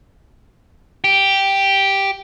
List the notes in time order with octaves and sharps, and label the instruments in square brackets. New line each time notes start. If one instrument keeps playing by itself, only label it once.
[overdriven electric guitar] G4